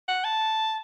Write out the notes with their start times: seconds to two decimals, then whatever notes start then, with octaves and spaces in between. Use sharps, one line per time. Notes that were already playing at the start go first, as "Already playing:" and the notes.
0.08 F#5
0.24 A5